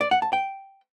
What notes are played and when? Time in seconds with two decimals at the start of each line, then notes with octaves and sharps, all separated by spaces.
0.01 D5
0.11 F#5
0.22 A5
0.33 G5